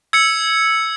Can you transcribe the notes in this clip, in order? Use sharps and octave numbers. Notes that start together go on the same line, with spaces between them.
E6 G#6 C#7